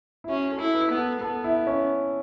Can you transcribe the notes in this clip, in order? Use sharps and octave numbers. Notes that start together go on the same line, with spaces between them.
E4
C#4 F#4
A4
E4
B4
B3
A4
B3 A4
E4
C#4